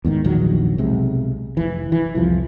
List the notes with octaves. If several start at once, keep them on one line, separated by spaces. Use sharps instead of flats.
E2 G#2 D#3
A#1 E2 D#3 F#3
B1 C3 G#3
F1 E3
E3
C2 F2 F3